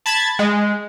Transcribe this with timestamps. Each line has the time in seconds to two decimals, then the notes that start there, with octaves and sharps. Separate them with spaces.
0.06 A5 B5 G#6 A6
0.39 G#3